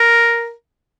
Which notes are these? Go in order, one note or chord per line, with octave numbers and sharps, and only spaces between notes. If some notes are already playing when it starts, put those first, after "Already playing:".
Already playing: A#4